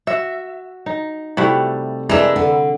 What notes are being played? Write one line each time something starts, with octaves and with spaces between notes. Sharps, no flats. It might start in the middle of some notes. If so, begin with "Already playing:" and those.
F#4 E5
D#4
C3 G3 A3 E4 F#4
E3 G#3 D4 A#4 E5
D3